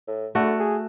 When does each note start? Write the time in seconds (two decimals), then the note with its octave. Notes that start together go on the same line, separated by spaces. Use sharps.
0.08 A2
0.35 D3 A3 F#4
0.59 G#4